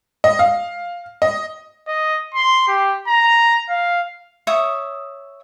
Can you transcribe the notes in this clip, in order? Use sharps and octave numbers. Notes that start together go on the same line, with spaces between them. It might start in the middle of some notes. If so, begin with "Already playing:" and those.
D#5
F5
D#5
D#5
C6
G4
A#5
F5
C#5 E5 D#6